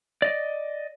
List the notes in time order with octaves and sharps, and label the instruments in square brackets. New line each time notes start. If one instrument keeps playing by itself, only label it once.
[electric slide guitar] D5 D#5